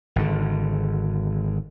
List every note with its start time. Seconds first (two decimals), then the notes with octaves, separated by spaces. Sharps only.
0.16 G#1 D3